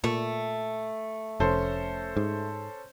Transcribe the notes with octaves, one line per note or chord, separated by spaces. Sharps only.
A#2 A3
F1 C#4 A4 C5
G#2